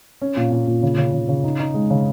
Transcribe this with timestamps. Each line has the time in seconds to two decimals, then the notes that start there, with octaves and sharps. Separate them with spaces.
0.22 C#4
0.37 A#2
0.52 A#2
0.67 A#2
0.83 C#3
0.98 C#3
1.13 C#3
1.28 C#3
1.44 D#4
1.60 D#4
1.74 G#3
1.90 C#3